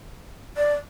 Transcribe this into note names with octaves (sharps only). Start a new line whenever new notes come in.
D5